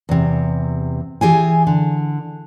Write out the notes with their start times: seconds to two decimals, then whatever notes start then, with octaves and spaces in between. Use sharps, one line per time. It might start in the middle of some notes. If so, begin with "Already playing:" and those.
0.09 E2 C3
1.21 E3 G4 G#4 G#5
1.67 D3